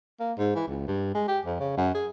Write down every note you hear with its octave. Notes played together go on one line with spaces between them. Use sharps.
A#3
G#2
E3
C#2
G2
G#3
G4
F2
C#3
F#2
G#4